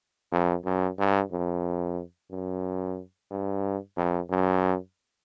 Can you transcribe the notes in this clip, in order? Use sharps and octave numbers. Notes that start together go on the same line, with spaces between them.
F2
F#2
G2
F2
F#2
G2
F2
F#2